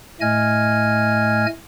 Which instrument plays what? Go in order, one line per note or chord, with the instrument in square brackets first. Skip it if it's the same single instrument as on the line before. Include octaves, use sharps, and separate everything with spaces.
[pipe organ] A2 A3 D#5 G#5 F6 G#6